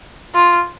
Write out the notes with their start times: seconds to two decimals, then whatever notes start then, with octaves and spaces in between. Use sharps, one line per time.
0.35 F4